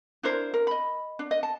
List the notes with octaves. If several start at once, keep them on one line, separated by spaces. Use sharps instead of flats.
D4 E4 A#4 C5
A#4
D#5 B5
D4
D#5
A5